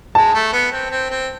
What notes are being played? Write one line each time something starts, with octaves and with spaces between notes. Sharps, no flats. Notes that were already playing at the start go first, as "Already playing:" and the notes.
G#3 A5
A3
B3
C4
C4
C4